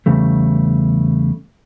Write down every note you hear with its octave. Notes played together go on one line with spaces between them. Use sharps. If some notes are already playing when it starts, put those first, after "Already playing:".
E2 C#3 G3 A3